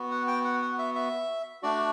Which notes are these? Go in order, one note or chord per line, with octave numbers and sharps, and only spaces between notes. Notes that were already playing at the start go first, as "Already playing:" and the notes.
Already playing: B3 F#4
F#5
G5
F#5
F#5
E5
E5
A3 D4 F#4 D5